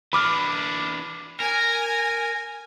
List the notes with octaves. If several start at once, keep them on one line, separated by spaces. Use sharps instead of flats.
E3 D4 B5 D6 F6
A#4 G#5